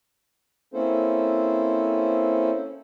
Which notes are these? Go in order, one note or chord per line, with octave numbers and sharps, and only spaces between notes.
A#3 C4 C#4 E4 A4 C5